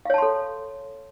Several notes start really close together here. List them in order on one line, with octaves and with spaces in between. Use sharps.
F5 C#5 A5 C6 A4